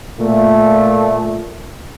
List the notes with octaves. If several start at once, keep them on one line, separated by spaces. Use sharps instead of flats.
A#2 A3